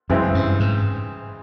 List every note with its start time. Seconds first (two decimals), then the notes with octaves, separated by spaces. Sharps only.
0.10 F#2 C#3 E3 G#3 C4 E4
0.35 G2
0.60 G#2